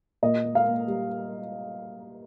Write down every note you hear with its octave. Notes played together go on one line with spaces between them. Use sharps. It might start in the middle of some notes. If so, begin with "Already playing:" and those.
A#2 D#5
A#3
F5
A#3
G3